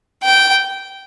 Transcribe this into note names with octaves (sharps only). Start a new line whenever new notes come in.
G5